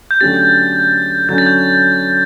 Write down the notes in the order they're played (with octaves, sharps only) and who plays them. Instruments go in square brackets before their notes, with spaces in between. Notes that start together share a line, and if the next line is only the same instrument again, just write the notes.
[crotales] G6
[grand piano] D3 F#3 A3 C#4 G4 [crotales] A6
[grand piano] D3 F#3 C#4 [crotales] G6
[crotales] A6
G6